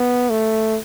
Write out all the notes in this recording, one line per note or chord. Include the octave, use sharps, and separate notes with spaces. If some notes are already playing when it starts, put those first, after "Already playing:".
Already playing: B3
A3